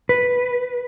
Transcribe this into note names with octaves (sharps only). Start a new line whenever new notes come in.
B4